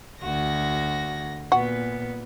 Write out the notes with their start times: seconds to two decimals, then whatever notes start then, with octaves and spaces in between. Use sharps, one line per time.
0.21 D2 F#4 A#6
1.52 A#2 B3 F#4